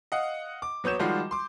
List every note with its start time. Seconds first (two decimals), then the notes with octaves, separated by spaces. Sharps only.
0.12 D#5 F5 F#5
0.62 D6
0.84 F#3 B3 C#5 G6 E7
0.99 D#3 F3 G3 G#3 F4 F#4
1.31 C6 D6